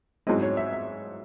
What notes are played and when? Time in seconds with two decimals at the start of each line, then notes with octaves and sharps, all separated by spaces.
0.27 G#2 F#3 C4 E4 D#5
0.42 C#5
0.57 E5
0.73 E5